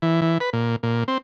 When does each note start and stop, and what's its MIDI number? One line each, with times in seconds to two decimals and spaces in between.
0.02 0.21 52
0.22 0.38 52
0.40 0.50 71
0.53 0.76 46
0.83 1.04 46
1.08 1.18 60